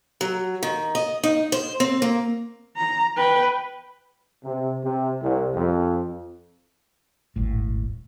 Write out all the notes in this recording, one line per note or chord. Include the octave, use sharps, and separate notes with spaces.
F#3
D#3
D#5
D#4
C5
C4
A#3
A#5
B4 G5
C3
C3
C2
F2
D#1 G#1 A2